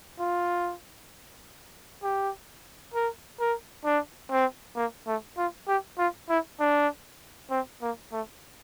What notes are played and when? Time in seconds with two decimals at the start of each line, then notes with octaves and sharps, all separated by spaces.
0.19 F4
2.03 G4
2.94 A#4
3.40 A#4
3.85 D4
4.31 C4
4.76 A#3
5.07 A3
5.37 F4
5.68 G4
5.98 F4
6.29 E4
6.60 D4
7.51 C4
7.82 A#3
8.12 A3